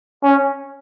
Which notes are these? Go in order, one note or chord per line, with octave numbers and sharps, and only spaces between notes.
C#4